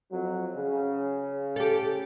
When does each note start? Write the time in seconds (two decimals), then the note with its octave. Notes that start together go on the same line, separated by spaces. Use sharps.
0.11 F2 F#3
0.55 C#3
1.56 G4 A4